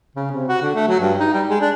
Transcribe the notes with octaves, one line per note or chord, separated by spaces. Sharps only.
C#3
C3
F#4
D3
A3
F#3
G2
D#4
G3
G#3
D4